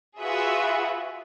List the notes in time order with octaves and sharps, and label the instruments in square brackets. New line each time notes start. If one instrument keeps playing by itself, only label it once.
[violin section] F4 F#4 G#4 B4 E5